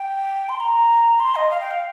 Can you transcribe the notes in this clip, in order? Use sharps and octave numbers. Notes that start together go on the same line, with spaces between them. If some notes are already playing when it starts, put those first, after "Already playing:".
Already playing: G5
C6
A#5
C6
D#5
F5
G5
F5